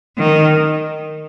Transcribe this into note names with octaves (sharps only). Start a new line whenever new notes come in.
D#3